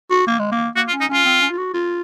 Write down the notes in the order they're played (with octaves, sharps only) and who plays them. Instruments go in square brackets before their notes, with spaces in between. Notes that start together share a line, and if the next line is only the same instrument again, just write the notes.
[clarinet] F#4
A#3
G#3
A#3
[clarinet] A#3 [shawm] F#4
[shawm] F4
[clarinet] C#4
[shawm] D#4
[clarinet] C#4 [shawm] F4
[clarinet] C4
C#4
F4
F#4
F4